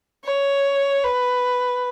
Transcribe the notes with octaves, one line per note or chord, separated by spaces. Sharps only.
C#5
B4